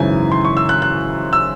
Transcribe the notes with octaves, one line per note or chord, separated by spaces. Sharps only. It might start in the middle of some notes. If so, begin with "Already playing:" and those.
Already playing: G#1 F#2 C#3 E3 G#5
C6
C#6
E6
F#6
F#6
E6